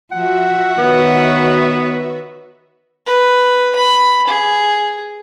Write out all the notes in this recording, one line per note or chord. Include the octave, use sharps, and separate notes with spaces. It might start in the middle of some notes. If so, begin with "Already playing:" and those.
F3 F#4 E5 F#5
D#3 B3 B4 C#5
B4
B5
G#4